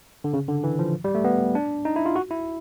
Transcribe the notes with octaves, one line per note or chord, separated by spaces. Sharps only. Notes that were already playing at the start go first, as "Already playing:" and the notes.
D3
C#3
D3
E3
F3
G3
A3
B3
D4
D#4
E4
F4
F#4
E4